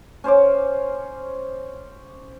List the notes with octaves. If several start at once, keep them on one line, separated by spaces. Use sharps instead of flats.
C#4 C5 C#5 D6